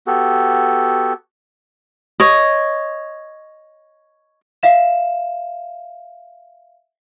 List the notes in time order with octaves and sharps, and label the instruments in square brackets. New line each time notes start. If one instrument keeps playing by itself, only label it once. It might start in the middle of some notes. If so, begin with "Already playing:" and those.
[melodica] B3 F#4 G4 A4
[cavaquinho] C#5 D#5
[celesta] E5 F5 E7